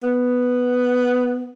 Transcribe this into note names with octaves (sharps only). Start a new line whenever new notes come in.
B3